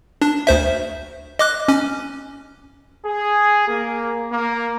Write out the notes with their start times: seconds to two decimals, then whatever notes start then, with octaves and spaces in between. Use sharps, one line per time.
0.22 D4
0.47 D2 C5 E5
1.39 D#5 D6 F#6
1.68 C#4
3.05 G#4
3.68 A#3
4.32 A#3